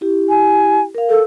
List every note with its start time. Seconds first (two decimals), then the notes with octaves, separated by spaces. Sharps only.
0.01 E4 G4
0.29 G#5
0.95 A#4 F5
1.09 A4